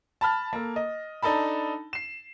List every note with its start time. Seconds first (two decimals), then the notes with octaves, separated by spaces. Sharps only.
0.21 A5 B5 F6 A6
0.53 A#3 A4
0.76 D#5
1.23 D4 D#4 A4 A5 B5
1.93 C7 E7